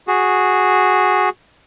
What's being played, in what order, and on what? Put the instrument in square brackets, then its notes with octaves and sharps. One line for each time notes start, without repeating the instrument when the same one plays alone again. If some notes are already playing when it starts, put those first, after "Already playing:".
[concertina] F#4 G#4